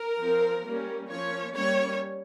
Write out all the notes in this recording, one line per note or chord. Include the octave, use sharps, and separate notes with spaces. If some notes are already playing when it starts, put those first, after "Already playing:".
Already playing: A#4
F3 C4
G3 A#3 C#4
F3 A#3 C#4 C#5
G3 A#3 C#4 C#5